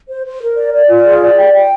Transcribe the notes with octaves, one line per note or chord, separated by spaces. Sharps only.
C5
C5
A#4
D5
D5
F4
G#4
D5
G5
G5